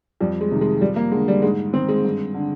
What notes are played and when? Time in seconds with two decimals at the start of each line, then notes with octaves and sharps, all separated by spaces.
0.21 F2 G3
0.41 G#3
0.51 C3 D#3
0.61 G#3
0.81 F2 G3
0.96 A#3
1.11 D3 G#3
1.28 G3
1.42 G#2 G#3
1.73 D#3 C4
1.89 G#3
2.05 G2
2.34 D3